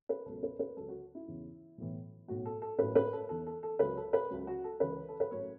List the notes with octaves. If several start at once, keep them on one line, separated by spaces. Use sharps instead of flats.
B4
C#2 B2 F#3 A4
B4
B4
C#2 C#3 F#3 A4
F#4
E4
E2 C#3 E3
B1 A2 E3
B1 A2 F#3 F#4
A4
A4
A1 A2 F#3 B4
B4
A4
E2 E3 A4
A4
A4
C#2 C#3 F#3 B4
A4
B4
C#2 C#3 F#3
F#4
A4
C#2 C#3 E3 B4
A4
B4
A1 A2 F#3 C#5